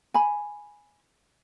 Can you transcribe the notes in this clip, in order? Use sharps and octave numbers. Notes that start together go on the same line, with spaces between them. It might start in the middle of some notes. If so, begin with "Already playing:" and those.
G#5 B5